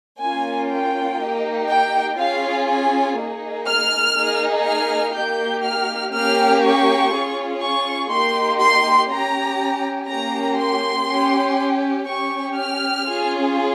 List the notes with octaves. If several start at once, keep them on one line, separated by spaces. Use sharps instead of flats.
A#3 C#4 F4 G#5
G5
A#3 D#4 G4
G5
C#4 F4 G#4 F5
G#5
A#3 D#4 G#4
F6
A#3 D#4 G#4
F6
A#3 D#4 G4 G6
F6
A#3 C#4 G4 F6
C#6
C#4 F4 G#4
C#6
A#3 D#4 G4 C6
C6
C#4 G4 A#5
A#3 C#4 G4 A#5
C6
C#4
G4
C#4 G4 C#6
F6
C#4 F4 G#4